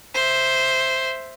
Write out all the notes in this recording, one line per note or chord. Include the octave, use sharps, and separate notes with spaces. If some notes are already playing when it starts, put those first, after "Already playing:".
C5 E5